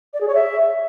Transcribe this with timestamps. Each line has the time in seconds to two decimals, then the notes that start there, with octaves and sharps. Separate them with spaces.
0.14 D5
0.21 G#4
0.28 C#5
0.35 E5